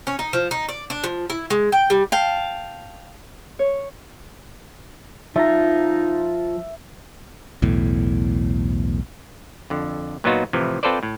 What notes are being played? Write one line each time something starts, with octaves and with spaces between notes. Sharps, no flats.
C#4
D#4
F3
D#4
D5
D4
F3
E4
G#3
G5
G3
F5 G5 A5
C#5
F3 D#4 F4 E5 A#5
B1 E2 A2
F2 D3
A#2 F#3 B3 D#4 F4 F#4
A2 C3 E3 F3
C4 F4 A4 B4 C5 D5
A2